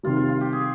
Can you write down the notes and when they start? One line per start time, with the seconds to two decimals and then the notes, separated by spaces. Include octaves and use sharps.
0.03 C3 D#3 G3 F4
0.16 F4
0.29 F4
0.41 G4
0.53 G#4